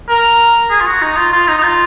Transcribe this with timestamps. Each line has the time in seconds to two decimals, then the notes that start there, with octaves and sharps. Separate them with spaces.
0.09 A#4
0.70 G#4
0.81 F4
0.86 F#4
1.02 D#4
1.17 F4
1.32 F4
1.48 D#4
1.58 D#4
1.63 F4